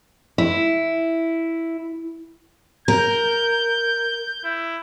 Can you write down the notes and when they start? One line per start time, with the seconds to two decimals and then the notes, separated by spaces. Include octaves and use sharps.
0.38 E4
2.88 A#4 G6
4.44 E4